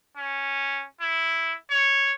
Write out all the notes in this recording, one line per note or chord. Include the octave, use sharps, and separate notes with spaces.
C#4
E4
C#5